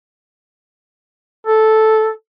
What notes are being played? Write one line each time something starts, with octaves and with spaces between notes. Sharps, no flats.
A4